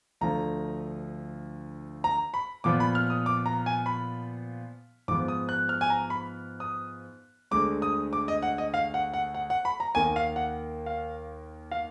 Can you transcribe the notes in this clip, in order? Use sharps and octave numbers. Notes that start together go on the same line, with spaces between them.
D2 D3 F3 A#5
A#5
B5
A#2 F3 B3 D6
B5
F6
D#6
D6
A#5
G#5
B5
G#2 F3 B3 D6
D#6
F#6
F6
G#5
A#5
B5
D#6
D2 D3 G#3 D6
D#6
D6
D#5
F#5
D#5
F5
F#5
F#5
F#5
F#5
B5
A#5
D#2 D#3 A#3 G#5
F5
F#5
F5
F5